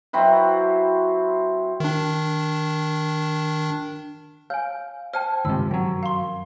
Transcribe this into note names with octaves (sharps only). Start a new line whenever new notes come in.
F#3 C4 E4 B4
D#3 D4
C#5 F5 G#5
C5 D5 G5 A5 F6
C#2 G2 C3 D#3 E6
F#2 F#3
F5 C6